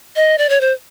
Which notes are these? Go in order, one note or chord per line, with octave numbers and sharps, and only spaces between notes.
D#5
D5
C#5
C5